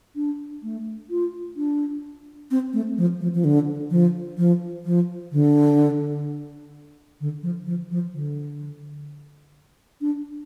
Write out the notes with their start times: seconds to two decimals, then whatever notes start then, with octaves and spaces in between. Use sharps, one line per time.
0.16 D4
0.63 A3
1.10 F4
1.56 D4
2.51 C4
2.73 A3
2.98 F3
3.21 F3
3.34 F3
3.44 D3
3.91 F3
4.38 F3
4.85 F3
5.32 D3
7.21 D3
7.43 F3
7.67 F3
7.91 F3
8.13 D3
10.01 D4